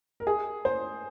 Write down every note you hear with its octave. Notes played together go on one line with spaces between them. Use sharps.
A#4
G#4
C5